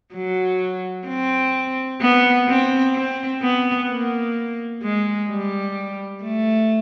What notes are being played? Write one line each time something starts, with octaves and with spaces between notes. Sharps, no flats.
F#3
C4
B3
C4
C4
B3
A#3
G#3
G3
A3